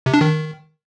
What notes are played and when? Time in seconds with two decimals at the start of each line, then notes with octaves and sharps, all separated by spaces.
0.06 C3
0.14 D4
0.21 D#3